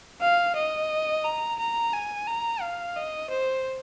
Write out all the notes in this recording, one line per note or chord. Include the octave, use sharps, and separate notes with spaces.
F5
D#5
A#5
A#5
G#5
A#5
F5
D#5
C5